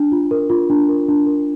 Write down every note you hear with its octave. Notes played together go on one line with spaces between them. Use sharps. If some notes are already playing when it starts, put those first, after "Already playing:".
Already playing: D4
F4
A#4
F4
D4
A#4
D4
A#4